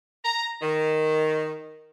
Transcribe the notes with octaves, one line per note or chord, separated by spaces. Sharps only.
A#5
D#3